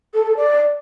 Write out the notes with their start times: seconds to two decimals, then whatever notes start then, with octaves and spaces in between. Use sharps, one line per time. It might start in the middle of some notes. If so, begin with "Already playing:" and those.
0.14 A4
0.26 A4
0.37 D5